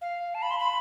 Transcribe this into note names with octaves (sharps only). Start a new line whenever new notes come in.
F5
A5
B5
C6
B5